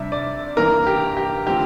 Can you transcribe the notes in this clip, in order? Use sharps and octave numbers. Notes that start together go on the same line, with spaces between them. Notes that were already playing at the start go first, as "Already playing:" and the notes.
Already playing: C3 G3 D4 E5
D5
G2 E3 A#3 A#4
G4
G4
D3 F3 A3 C4 G4